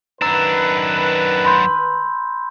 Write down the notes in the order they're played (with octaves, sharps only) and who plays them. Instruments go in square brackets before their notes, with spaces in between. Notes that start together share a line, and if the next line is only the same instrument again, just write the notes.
[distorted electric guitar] F#2 D4 [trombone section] D#3 B4 [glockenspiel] A#5 E6
[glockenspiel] B5 C6 G6